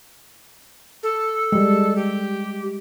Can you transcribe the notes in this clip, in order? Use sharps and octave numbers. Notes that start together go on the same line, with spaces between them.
A4
G3 G#3
G4